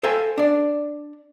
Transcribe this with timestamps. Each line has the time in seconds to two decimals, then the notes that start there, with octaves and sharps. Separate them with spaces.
0.03 A4 C5 F5 G5 G#5
0.38 D4 D5